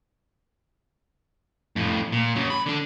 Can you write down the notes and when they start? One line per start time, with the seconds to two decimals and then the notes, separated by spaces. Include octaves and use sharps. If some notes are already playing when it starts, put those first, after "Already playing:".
1.76 F2 A2
2.12 A#2
2.35 C#3 F#3
2.50 B5
2.66 D3 D4